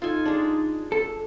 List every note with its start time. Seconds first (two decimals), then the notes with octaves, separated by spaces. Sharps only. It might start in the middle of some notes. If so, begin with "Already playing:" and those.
0.02 D#4 F4 A4 G#5
0.25 G#3 D4
0.92 A4